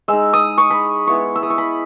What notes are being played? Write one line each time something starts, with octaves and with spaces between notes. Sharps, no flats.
G#3 D#4 E6
D#6
C#6
B5
G#3 B3 E4 C#6
E6
D#6
C#6
B5